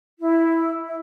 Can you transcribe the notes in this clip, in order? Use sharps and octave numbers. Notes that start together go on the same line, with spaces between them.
E4
E5